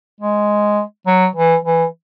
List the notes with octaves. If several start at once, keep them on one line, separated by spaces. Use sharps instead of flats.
G#3
F#3
E3
E3